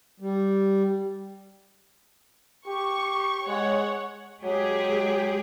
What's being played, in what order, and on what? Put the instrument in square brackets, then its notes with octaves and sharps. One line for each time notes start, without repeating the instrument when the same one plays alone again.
[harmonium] G3
[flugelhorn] G4 [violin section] C#6
[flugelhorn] G#3 [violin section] C#5 F#5
[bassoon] F#3 [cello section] G#3 G4 G#4